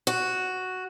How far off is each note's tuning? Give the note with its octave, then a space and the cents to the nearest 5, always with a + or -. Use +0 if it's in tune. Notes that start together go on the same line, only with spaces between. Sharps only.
F#4 +0